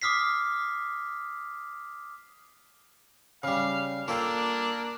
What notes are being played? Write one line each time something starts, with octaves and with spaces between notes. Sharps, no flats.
D6 D#6 F6 B6 C7
C#3 G3 F5
A#3 D4 F4 A4 G5